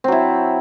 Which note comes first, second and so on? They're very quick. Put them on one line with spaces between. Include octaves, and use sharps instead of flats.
C4 F#3 E4